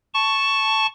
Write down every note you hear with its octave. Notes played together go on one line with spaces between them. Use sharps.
A5 C#6